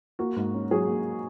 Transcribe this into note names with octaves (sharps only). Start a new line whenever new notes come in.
A#3 F#4
G#2
C#4
F#3 G#4
A#3